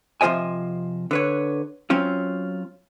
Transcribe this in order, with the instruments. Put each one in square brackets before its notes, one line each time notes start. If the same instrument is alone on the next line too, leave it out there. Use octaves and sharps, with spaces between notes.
[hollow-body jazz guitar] C3 F3 F4 C5 D#5 G#5
D3 B4 C#5
F#3 C4 C#4 F4